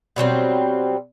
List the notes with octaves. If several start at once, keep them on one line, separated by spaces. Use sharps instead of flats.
B2 F#3 G3 C4